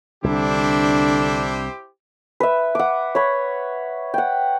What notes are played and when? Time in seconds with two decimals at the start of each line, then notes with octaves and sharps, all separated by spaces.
0.24 C2 D3 D4 E4 G4 C5
2.40 B4 E5
2.75 F#5 D6
3.15 C#5 B5
4.14 F#5 G5